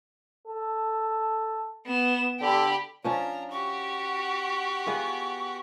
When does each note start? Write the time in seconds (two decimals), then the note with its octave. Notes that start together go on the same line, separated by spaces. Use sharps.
0.47 A4
1.86 B3 E7
2.41 D3 G4 B5
3.04 F3 C#4 D4 F4 A#5
3.52 F#4 G4 C#6
4.86 B3 F4 G#4